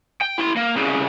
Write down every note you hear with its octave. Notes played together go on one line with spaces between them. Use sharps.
G5
E4 C6
A#3
C2 C#3